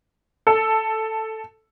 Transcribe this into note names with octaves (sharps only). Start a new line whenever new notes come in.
A4